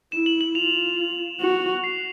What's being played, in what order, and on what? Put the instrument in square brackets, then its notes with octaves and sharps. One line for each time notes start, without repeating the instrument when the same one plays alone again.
[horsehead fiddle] E4 [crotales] E7
[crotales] F#7
F#7
[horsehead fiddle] F4 [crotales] F7
[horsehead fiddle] F#4 [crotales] F#7
[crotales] C7